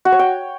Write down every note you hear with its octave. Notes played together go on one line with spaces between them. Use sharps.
F#4
C#5
G5